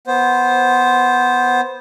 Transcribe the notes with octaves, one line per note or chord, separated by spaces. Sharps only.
B3 C5